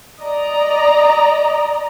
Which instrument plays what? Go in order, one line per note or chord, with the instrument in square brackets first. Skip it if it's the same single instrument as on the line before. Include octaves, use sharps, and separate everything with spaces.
[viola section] D5 D#5 A#5